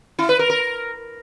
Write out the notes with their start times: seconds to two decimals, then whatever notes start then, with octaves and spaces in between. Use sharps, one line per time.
0.19 E4
0.29 B4
0.39 A#4
0.50 A#4